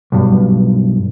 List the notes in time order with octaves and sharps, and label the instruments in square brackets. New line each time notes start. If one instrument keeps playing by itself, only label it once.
[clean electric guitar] B1 G2